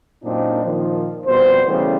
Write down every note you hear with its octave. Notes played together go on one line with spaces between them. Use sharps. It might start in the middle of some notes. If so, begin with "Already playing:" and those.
F#2 A#2 C4 D4 D#4
A#2 D#3 F3
F2 B2 G3 C5
C#3 E3 G3 A3 B3